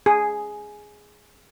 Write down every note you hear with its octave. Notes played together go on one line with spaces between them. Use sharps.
G#4